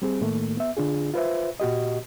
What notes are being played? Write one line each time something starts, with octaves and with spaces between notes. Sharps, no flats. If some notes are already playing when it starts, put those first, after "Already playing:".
G3 C4 G#4
A2 D#3 A3 A#3
B3 E5
D3 D4 F4 G#4
F4 B4 C5 E5
A#2 F#4 G4 D#5